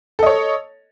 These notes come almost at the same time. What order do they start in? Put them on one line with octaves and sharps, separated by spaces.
A4 D#5 C#5